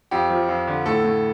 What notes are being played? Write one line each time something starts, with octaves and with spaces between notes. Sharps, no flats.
F2 G4
F3
F2
D3
A2 A4
A2